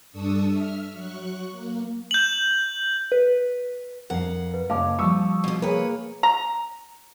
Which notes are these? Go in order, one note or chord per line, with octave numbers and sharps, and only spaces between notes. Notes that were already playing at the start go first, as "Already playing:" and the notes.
G2 D4 A4 C#6 D#6 E6
E5 F6
F#3 C#6 F#6
A#3
G6 F#7
B4
F2 A#4 F5 F#5
B4
F#1 A#4 C#5 F5 A5 D6
F3 G3 C#6 D#6 E6
G#2 B2
A#3 G#4 B4 C#5
A#5